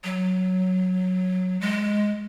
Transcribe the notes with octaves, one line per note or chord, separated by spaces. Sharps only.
F#3
G#3